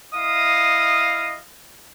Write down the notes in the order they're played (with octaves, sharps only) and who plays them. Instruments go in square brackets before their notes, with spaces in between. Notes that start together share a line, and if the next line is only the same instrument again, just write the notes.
[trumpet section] E4 D#5 F5 D#6